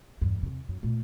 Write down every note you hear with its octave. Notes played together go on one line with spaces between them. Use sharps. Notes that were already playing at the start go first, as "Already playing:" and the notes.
E2 G2
E2 C3
F#2
A#2 A3